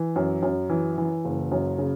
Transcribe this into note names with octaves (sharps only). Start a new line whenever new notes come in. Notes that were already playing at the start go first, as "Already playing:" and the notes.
Already playing: E3
F#2
F#2
E3
E3
F#1
F#2
C#3